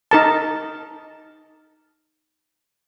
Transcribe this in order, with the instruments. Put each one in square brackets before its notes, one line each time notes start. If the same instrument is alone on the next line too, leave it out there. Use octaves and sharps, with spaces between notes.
[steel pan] D#4 A#4 A5